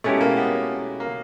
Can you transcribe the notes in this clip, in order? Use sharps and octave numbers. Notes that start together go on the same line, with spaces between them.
B2 G#3 A3 C#4 E4 G4
A#3
B3
A#3